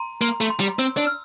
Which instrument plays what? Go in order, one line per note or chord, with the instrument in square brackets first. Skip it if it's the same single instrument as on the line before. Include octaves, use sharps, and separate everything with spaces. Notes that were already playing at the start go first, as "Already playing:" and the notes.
Already playing: [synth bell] A#5 C6
[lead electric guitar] A#3 [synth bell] C6
[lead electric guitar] A3
[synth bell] C6
[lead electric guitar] G3
[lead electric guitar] C4 [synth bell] E6
[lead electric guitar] D4
[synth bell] F6